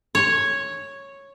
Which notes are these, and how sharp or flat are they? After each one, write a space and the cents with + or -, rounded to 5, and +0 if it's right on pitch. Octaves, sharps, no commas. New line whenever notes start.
C#5 -5